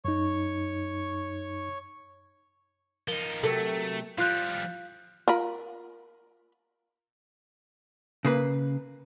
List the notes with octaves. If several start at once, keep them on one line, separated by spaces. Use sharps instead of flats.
F#2 D#4 C#5 C#6
F3 D#4 A#4 G7
C3 F#3 A3 A4 A#4
F3 G3 F4 F5 F#6 G6
F4 A#4 B5
C#3 A#3 B4